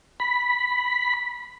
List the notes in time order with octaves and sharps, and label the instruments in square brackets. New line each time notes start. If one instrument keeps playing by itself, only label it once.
[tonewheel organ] B5